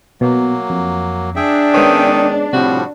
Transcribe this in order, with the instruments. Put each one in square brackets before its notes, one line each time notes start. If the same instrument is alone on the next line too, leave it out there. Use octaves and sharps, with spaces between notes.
[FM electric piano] B2 [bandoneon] F#3 A#3
[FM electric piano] F2
[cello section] D4 [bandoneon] G#4 E5 G5
[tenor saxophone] D#3 [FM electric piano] G#3 B3 C#4
[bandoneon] A2 F3 G3 [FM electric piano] C3 [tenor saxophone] F#4